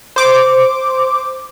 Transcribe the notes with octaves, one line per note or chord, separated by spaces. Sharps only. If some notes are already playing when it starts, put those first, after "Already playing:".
C5 D6